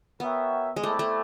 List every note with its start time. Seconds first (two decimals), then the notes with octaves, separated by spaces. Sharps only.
0.20 B3 F#4 A#4 C#5 E5 G5
0.76 G#3
0.83 G3 A3 C4 E4 A4 D5
0.99 A3